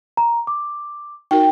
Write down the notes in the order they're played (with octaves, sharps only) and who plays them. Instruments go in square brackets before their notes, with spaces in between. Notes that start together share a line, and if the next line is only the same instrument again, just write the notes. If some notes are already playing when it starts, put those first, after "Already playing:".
[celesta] A#5
D6
[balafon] D#4 F#4 A#4 [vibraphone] G5